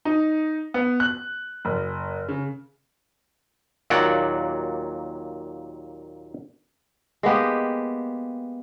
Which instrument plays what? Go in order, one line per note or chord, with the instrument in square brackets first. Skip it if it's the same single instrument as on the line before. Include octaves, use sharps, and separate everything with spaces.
[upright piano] D#4
B3
F#6
F#1
C#3
[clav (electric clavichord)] D#2 A#2 F#3 D5 F#5
[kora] G#3 A#3 B3 G4